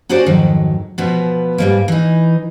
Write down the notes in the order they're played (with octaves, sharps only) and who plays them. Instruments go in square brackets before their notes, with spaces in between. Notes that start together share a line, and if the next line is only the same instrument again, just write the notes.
[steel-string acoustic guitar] C#4 F#4 G#4 A#4 C5 D5
F2 G#2 D#3 F#3
B2 F3 B3
G#2 G3 A#3
E3 D#4